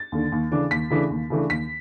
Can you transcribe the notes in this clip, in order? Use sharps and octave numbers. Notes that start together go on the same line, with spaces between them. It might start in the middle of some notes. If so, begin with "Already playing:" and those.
Already playing: A6
D#2 D3
D#2
C#3 E3 A3 D4
D#2 B6
C#3 E3 A3 D4
D#2
C#3 E3 A3 D4
D#2 B6